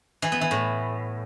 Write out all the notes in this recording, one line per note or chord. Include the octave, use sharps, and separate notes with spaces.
E3
B3
E3
A2